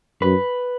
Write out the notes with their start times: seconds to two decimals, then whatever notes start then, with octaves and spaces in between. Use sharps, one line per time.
0.21 F#2 B4